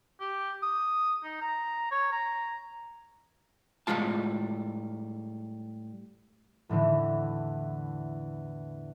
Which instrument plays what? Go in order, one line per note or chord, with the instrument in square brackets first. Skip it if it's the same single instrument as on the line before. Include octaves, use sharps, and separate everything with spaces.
[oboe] G4
D#6
D#4
A#5
C#5
A#5
[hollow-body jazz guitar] A2 G3 G#3 F4 A5
[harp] E2 A2 D3 E3